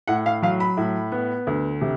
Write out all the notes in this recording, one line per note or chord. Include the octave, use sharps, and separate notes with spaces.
A2 F#5
F5
F#3 F5
B5
A2
B3
D2
C3